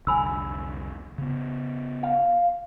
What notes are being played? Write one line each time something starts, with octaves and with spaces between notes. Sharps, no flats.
C2 F2 D3 G#5 B5 E6
C#3 B3
F5